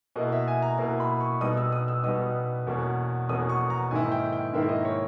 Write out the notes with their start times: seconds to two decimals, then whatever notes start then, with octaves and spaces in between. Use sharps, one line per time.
0.16 B2 A#3 E4 D#5
0.32 E5
0.48 G#5
0.62 A#5
0.78 B2 A#3 E4 A#5
1.00 B5
1.20 C#6
1.41 B2 G3 B3 D#4 D#6
1.57 E6
1.72 D#6
1.88 E6
2.03 B2 G3 B3 D#4 D#6
2.67 E2 B2 A#3 C#4
3.29 E2 B2 A#3 C#4 D#6
3.49 C#6
3.70 A#5
3.91 G#2 D#3 A#3 E4 G#5
4.12 G5
4.32 G5
4.53 G#2 D#3 A#3 E4 E5
4.69 D#5
4.85 C#5